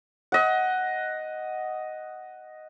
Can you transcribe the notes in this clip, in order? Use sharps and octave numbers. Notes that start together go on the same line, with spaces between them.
D#5 F#5